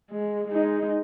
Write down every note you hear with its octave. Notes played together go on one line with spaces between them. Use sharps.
G#3
G#3 D#4